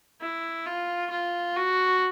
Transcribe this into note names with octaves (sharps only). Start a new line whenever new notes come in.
E4
F4
F4
F#4